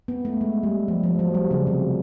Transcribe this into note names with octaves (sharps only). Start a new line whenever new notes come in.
B3
A3
G#3
G3
F3
F3
F#3
G3
C#3
C3